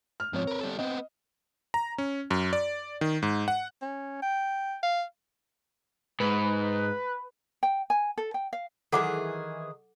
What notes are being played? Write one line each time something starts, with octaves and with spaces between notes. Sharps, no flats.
F6
G#2 F3 C4 C#5
A#4 B4
G3 A4
B3 C4 D#5
A#5
C#4
F#2
D5
D#3
G#2
F#5
C#4
G5
F5
G#2 B4
G5
G#5
A4
G5
F5
D#3 E3 G#4 A4 F#5 D6